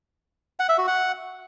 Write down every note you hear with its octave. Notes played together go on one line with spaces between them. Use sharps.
F#5
E5
F#4
F#5